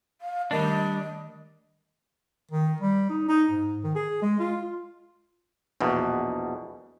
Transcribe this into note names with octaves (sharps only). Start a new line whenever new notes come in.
F5
D#3 G3 A3 D4 A#4 D#5
D#3
G3
D#4
D#4
G#2
D#3
G#4
G#3
F4
A#1 E2 B2